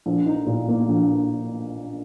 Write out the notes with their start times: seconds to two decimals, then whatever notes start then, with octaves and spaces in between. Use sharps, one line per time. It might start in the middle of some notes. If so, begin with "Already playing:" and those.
0.06 A#1
0.26 D#4
0.46 A#2
0.68 A#3
0.88 A#1